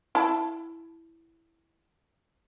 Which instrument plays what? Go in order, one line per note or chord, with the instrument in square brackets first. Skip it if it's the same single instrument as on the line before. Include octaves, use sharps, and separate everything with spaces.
[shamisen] E4 A5